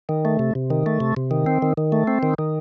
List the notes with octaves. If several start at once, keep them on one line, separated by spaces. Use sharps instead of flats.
D#3
A3
C3
C3
D#3
A3
C3
C3
D#3
C4
D#3
D#3
A3
C4
D#3
D#3